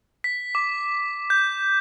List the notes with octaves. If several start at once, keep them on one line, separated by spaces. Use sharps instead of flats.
B6
D6
G6